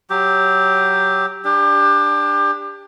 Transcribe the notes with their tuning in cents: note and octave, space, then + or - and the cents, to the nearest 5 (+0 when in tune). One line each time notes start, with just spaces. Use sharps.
F#3 +10 G4 +0
D4 +0 G4 +25